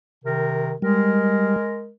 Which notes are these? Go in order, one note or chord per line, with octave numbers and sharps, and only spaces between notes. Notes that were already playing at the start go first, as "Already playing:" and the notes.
C3 D#3 A#4
G3 G#3 A#4